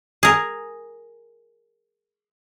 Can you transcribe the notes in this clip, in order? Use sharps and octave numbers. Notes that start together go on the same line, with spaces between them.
G#4 A#4